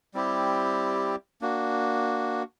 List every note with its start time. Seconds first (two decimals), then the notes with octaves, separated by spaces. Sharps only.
0.14 G3 C4 E4 G4
1.41 A#3 D4 F#4